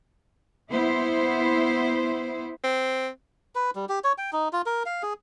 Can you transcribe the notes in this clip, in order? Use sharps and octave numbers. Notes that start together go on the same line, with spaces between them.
B3 E4 C5
C4
B4
G3
G4
C#5
G5
D#4
F4
A#4
F5
G#4